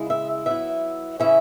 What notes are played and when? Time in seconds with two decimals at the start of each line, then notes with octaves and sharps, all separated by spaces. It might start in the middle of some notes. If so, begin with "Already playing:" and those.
Already playing: C#3 G#3 E4
0.10 E5
0.46 F#3 B3 E4 E5
1.20 C#3 E3 C#4 E4 E5